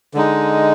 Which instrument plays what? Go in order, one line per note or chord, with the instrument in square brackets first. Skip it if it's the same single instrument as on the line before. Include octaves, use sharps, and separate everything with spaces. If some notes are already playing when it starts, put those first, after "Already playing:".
[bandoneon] D3 G#3 D#4